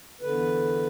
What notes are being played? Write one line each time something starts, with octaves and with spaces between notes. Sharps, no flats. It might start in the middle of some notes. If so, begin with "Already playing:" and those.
E2 D3 B4